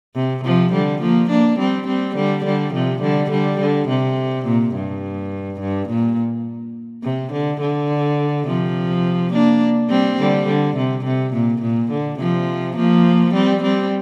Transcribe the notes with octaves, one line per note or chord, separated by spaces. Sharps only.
C3
C3 F3
D3 G3
F3 A#3
A#3 D4
G3 C4
G3 C4
D3 G3
D3 G3
C3 F3
D3 G3
D3 G3
D3
C3
A#2
G2
G2
A#2
C3
D3
D3
C3 F3
A#3 D4
G3 C4
D3 G3
D3
C3
C3
A#2
A#2
D3
C3 F3
F3 A#3
G3 C4
G3 C4